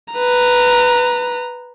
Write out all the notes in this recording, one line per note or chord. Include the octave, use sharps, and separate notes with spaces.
B4 A#5